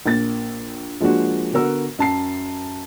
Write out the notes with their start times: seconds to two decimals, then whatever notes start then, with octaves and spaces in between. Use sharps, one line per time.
0.06 A#1 A#3 A6
1.00 F3 G#3 A#3 D4 F#4
1.53 D3 B3 F#4 A#4 E6
1.99 F#2 A5 C7